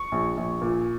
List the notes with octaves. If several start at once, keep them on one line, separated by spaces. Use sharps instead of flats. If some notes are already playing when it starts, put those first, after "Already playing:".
Already playing: C#6
A#1
A#1
A#2